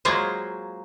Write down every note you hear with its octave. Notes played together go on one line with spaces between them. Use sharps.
F#3 G#3 A#3 F4 C5